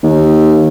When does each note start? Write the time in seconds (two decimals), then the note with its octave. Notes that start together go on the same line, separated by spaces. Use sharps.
0.03 D#2